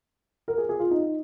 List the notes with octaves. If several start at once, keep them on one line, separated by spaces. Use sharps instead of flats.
A#4
G#4
G#4
F4
D#4